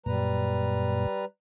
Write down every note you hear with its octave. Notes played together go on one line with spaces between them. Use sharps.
F#2 A#2 G3 B4 A#5